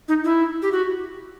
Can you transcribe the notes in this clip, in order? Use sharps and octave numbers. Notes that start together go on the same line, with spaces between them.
D#4
E4
G4
F#4